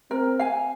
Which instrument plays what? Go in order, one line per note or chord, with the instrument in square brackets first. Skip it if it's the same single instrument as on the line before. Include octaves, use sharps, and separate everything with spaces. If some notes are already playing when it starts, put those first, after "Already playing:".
[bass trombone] C4 [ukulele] A#4
[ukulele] F5 G#5